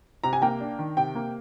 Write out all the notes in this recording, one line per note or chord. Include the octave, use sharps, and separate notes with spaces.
C3 A#5
G#5
A#3 G5 A#5
D4
D#3
C3 G5
A#3